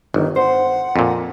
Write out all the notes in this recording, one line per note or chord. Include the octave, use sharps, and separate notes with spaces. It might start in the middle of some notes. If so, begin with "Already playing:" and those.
G1 D#3
C5 F#5
F2 A#2